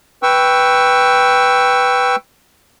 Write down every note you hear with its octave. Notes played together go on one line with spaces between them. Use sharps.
B4 G5 C#6 E6